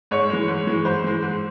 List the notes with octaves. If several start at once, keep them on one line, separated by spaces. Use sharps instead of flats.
G#2 C#5
E3 G#3
G#2
E3 G#3
G#2 C5
E3 G#3
G#2